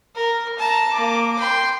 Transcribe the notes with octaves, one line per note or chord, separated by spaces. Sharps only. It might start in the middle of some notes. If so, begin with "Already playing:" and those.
A#4
A5 A#5
A#3 D6
G5 C6